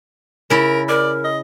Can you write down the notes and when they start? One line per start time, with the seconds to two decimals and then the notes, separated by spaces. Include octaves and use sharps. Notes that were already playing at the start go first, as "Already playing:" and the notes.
0.50 C#3 E4 A#4
0.89 A#4 D5
1.24 D#5